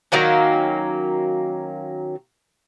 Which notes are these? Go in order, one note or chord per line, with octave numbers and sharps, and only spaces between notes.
D#3 F#3 A#3 C#4